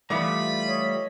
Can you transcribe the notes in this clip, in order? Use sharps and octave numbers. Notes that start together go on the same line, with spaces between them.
E3 G3 A3 B3 F4 D5 B5
C#5 D#5